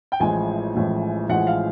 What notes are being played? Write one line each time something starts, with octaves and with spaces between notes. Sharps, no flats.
G5
A1 A2 F3 G#3 G#5
A1 A2 F3 G#3
A1 A2 F3 G#3 F#5
F5